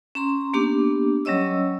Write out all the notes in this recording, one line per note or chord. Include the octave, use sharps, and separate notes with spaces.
C#4 A#5 C6
A#3 B3 D4 G4 D6
F#3 G3 C#4 C#5 D#5 E6